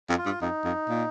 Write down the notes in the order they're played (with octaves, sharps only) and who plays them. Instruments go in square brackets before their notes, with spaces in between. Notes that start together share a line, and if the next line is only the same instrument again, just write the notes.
[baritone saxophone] F2
[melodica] F4
[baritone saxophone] G2
[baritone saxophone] F2 [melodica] D#4
[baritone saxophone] F2
A#2